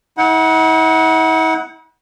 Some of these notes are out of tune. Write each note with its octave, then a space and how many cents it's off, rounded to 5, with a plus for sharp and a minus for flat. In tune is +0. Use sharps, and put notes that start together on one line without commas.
E4 -45 F#5 +0